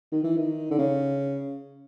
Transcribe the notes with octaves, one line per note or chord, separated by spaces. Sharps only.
D#3
E3
D#3
D3
C#3